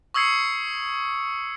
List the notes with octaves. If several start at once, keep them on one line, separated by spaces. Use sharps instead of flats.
C#6 D#6 E6 G#6 C7 C#7